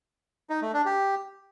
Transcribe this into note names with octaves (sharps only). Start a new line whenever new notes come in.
D#4
A3
D4
G4